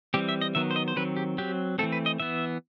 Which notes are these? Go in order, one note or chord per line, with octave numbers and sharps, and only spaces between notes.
E3 G3 C4 G4
E5
D#5
D#3 F#3 B3 E5
C5
D#5
C5
D#3 F#3 C4 B4
G4
F#3 C4 G4
E3 A3 C4 A4
B4
D#5
E3 B3 E5